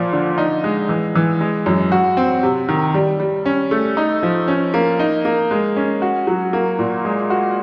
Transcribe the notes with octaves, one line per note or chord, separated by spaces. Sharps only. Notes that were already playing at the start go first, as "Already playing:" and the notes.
Already playing: A#2 F3
D3
D#4
G#3
E3
E3
G#3
F#2
F#4
C4
C3
D#3
G3
G3
C#4
A3
D#4
F3
C#4
A#3
D#4
A#3
G#3
C#4
F#4
F#3
A#3
A#2
G#3
F#4